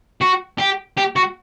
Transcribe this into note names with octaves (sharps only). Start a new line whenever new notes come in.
F#4
G4
G4
F#4